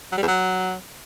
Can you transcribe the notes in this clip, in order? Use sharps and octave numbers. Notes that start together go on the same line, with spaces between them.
F#3
G3
E2
F#3